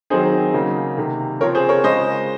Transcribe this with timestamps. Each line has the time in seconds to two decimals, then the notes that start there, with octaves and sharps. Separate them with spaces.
0.10 D#3 F#3 C4 D#4 G#4 C5
0.54 C#3 F#3 A#3 D#4
0.98 C3 D#3 A#3
1.40 C#3 F3 C4 A#4 C#5
1.55 G#4 C5
1.69 A#4 C#5
1.84 C#3 F3 G#3 C5 D#5